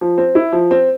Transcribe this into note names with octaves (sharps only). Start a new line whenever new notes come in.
F3
C4
E4
F3
C4